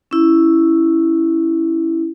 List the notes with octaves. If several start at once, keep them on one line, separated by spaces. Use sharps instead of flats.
C#4 E4